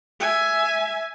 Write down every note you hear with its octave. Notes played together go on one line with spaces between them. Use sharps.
E5 G#5